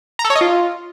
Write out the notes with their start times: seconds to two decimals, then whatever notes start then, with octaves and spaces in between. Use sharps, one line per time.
0.19 A#5
0.25 A4
0.30 C#5
0.35 D#5
0.41 F4